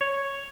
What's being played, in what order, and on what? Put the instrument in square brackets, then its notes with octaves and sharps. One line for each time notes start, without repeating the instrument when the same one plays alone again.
[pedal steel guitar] C#5